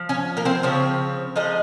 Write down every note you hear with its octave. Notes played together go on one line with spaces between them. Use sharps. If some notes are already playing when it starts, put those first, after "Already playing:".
Already playing: F3
C#4 C#5
A#3 A#4
C4 C5
C#3 F3 C4 C#5
F3 G#3 D#4 D#5